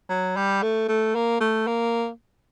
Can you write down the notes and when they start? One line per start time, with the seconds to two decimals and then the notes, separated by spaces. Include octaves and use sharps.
0.09 F#3
0.36 G3
0.63 A3
0.88 A3
1.15 A#3
1.40 A3
1.67 A#3